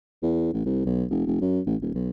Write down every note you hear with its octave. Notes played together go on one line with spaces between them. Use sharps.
E2
A1
C2
B1
F1
F1
F#2
A1
D#1
B1